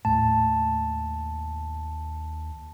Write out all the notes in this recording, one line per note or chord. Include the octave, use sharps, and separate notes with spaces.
D#2 A2 A5